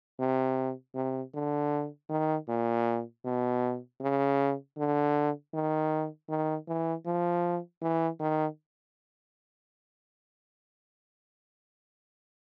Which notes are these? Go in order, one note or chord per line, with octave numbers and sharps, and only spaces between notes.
C3
C3
D3
D#3
A#2
B2
C#3
D3
D#3
D#3
E3
F3
E3
D#3